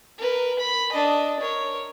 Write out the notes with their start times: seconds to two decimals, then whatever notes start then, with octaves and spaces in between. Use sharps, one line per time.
0.18 A#4 B4
0.59 B5
0.92 D4 D#5
1.40 A#4 C#5